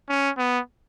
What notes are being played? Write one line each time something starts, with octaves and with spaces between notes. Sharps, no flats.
C#4
B3